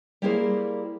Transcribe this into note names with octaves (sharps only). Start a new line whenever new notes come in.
G3 A#3 E4 G#4 A#4 C5